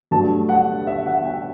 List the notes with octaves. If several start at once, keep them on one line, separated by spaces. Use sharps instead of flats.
G2 F#3 A3 A5
F#5
E5
F#5
G5